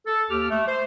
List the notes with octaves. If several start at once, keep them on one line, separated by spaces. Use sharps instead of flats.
A4
D#2 G4 F6
A3
C5